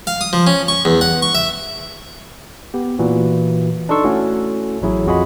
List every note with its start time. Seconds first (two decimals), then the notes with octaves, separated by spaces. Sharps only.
0.07 F5
0.21 D#6
0.33 F3
0.47 C#4
0.68 C#6
0.85 E2
1.01 F#5
1.22 C#6
1.35 E5
2.74 B3 G4
2.99 A#2 E3 F#4
3.89 D4 D#4 A4 C6 C#6 E6
4.04 A3 C#4 E4 F#4 A4
4.82 A1 F#3 E4 G#4
5.06 F2 F4 F#4 G#4 D#5 B5